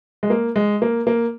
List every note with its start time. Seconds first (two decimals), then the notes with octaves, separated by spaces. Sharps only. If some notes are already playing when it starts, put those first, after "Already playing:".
0.23 G#3
0.30 A#3
0.56 G#3
0.82 A#3
1.07 A#3